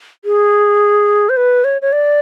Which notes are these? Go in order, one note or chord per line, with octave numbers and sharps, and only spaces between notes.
G#4
C5
B4
C#5
C#5
D5